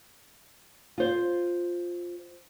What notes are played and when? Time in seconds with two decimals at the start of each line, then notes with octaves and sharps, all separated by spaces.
0.98 F4 C5